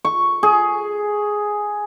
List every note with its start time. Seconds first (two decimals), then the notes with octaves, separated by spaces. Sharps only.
0.05 C#6
0.43 G#4